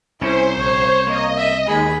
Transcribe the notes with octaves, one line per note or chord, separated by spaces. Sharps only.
C2 C#3 C#4 E4 C5
A#1 C#5
A#3 D#5
E5
D#2 G#3 G#4 B5